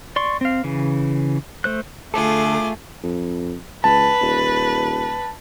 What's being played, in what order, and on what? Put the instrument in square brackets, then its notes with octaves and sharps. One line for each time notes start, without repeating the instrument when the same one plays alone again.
[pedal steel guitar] D5 C6 C#6
C4 F5
C#3 E3
A3 C5 F#6
[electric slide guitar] D3 A4 [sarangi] A3 [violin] F4 G#4 [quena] D6
[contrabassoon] F2
[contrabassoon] C#2 [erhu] B4 [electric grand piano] A5
[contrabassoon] D#1